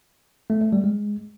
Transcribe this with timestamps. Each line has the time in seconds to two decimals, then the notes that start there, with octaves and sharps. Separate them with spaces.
0.50 A3
0.61 A3
0.73 G3
0.84 G#3